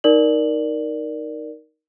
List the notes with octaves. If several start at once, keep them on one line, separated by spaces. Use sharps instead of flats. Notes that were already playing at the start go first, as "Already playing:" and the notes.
D#4 A#4 D5 F#7